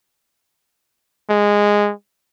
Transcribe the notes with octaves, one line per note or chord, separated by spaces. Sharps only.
G#3